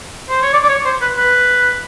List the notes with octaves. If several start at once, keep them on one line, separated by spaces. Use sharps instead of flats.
C5
C#5
D5
D5
C#5
C5
B4
B4